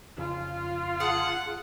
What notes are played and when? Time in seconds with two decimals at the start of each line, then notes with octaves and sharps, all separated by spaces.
0.18 F2 C#3 F4
1.00 G#4 F#5 A5